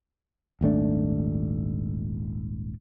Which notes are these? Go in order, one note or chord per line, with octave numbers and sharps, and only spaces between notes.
D#1 G#1 A3 D4